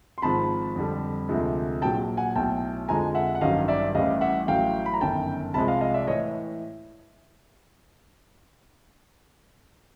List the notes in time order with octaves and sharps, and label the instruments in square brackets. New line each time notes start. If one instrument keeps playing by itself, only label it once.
[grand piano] C6
G#1 G#2 F3 A5 B5
F2 D3 G3
D2 C3 F3 G#3
A#1 A#2 F#3 G5 A5
F#5 G#5
B1 A2 F#3 G5 A5
F2 D3 F3 G#3 G#5 A#5
E5 F#5
F#5
A1 G2 D#3 F#3 D#5 F5
D5 E5
A1 A2 E3 G3 D#5 F5
E5 F#5
A1 A2 F#3 F5 G5
B5
A#5
G1 F#2 D#3 G5 A5
C2 C3 F3 G#3 A5 B5
D#5 F5
D#5 F5
D5 E5
A2 E3 C#5 D#5